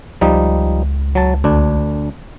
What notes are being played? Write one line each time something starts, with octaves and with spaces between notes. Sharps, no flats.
C#2 F3 G3 D#4
F#3 A5
D2 D4